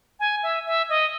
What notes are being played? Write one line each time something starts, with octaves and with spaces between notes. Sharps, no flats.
G#5
E5
E5
D#5